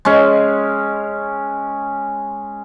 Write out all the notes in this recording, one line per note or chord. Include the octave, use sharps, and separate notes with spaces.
G#3 C#4